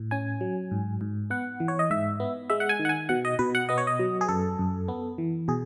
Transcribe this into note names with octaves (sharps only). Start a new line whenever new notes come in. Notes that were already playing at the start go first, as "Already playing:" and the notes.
Already playing: A2
C#4 G#5
F#3
G#2
G#2
B3 F#5
E3
C#5
D#5
G#2 E5
B3
G#3 E5
F#5
G#5
D#3
F#5
G#5
B2 F#5
D#5
B2 B4
F#5
B3 D#5
C#5
D#5
F#3
G#4
F#2 A4
F#2
B3
E3
B2 G#4